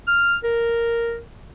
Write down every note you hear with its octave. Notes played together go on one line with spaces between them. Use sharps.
F6
A#4